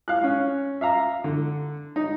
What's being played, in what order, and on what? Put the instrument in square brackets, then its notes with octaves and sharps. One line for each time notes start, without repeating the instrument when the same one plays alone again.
[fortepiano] F5 F#6
C#4
E5 F5 A#5
D3
D#4